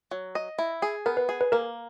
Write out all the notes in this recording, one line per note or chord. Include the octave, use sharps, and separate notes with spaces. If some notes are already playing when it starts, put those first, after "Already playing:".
F#3
D#5
E4
G#4
B3 A#4
B4
G#4
B4
A#3 A#4